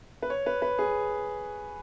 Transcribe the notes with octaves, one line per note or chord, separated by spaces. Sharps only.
B4
C#5
B4
B4
G#4